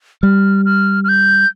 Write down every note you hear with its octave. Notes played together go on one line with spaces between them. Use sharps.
G3 F6
F6
F6
G6